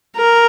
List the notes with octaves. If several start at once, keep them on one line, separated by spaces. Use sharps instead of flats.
A#4